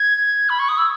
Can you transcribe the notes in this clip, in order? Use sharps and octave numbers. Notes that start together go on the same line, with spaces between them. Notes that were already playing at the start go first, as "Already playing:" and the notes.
Already playing: G#6
B5
C#6
D#6
E6